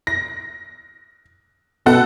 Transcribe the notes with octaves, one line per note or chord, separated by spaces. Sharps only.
A#6
B2 A4 F#5